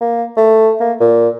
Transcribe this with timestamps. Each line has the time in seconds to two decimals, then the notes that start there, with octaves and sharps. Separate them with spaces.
0.01 A#3
0.37 A3
0.80 A#3
1.00 A#2